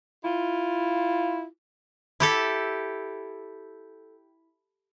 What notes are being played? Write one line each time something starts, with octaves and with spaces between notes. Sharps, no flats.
E4 F4
E4 G4 A4